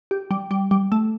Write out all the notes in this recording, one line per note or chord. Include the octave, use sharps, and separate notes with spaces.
G4
G3
G3
G3
A3